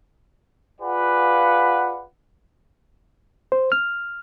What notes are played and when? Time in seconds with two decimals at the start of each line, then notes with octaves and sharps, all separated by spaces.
0.81 F4 G#4 B4 D5 F5 F#5
3.52 C5
3.72 F6